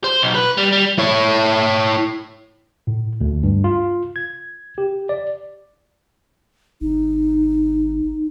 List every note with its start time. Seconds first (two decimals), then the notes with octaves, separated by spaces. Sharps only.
0.04 C5
0.22 B1
0.35 B4
0.57 G3
0.72 G3
0.99 E4 C#5
2.87 A2
3.21 D2
3.43 G2
3.64 F4
4.16 G#6
4.78 G4
5.09 D5
6.81 G#1 D#4